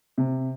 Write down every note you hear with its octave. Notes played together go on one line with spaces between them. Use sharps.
C3